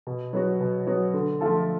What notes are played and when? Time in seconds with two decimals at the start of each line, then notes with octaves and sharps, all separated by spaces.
0.07 B2
0.33 F#3 B3 F#4
0.60 B2
0.87 F#3 B3 F#4
1.14 D3
1.41 F3 A3 F4 A4